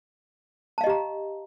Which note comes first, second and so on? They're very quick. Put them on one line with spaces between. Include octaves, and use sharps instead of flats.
A5 F5 D#5 G4 A#5